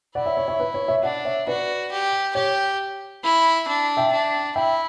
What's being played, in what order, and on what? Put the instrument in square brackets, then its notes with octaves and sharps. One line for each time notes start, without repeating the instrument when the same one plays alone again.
[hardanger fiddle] E4 [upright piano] D5 F#5
[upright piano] C#5 E5
C#5
C#5 E5
B4
C#5
C#5 E5
[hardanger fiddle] D4 [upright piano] D5 F#5
[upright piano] C#5 E5
[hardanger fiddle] F#4 [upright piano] B4 D5
[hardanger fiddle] G4
[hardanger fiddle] G4 [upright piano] C#5
[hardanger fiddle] E4
D4
[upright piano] E5 G5
[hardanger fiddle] D4
[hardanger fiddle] E4 [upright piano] E5 G5